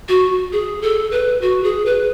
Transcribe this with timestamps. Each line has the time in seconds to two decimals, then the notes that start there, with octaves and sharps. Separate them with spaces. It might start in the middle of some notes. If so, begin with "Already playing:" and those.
0.08 F#4
0.52 G#4
0.82 A4
1.12 B4
1.41 F#4
1.64 G#4
1.86 B4